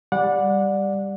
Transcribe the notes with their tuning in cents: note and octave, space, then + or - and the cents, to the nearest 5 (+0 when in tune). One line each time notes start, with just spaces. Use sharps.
G3 +10 D5 +0 F#5 -25